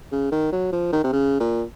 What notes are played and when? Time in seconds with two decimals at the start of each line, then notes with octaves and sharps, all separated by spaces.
0.12 C#3
0.32 D#3
0.52 F#3
0.72 F3
0.93 D#3
1.04 C3
1.13 C#3
1.40 A#2